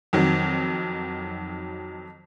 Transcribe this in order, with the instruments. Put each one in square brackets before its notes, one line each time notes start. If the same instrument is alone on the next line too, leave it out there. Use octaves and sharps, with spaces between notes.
[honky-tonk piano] F2 D#3 F#3